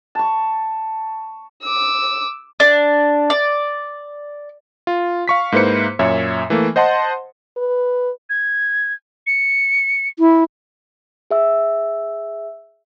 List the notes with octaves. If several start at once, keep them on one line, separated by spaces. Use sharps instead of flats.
A5 C#6
D6 E6
D4
D5
F4
F5 C#6 B6
G#2 A#3 E4 B4 C5 C#7
F#2 A#2 C#5 E5
E3 A3 A#3
C5 D#5 F#5 A5 C6
B4
G#6
C#7
E4
G#4 E5 E6